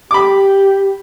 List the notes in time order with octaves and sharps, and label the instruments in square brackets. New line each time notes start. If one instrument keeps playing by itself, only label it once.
[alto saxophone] G4 [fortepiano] B5 D6